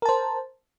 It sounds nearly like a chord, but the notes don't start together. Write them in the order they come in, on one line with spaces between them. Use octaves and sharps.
A#4 A5 C5